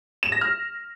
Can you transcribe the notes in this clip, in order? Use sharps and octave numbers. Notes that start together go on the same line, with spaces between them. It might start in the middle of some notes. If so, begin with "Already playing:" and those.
E7
A#6
F6